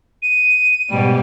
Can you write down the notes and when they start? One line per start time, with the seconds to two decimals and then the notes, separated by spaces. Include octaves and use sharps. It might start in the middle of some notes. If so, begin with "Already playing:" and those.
0.22 D#7
0.91 G#2 B2 G3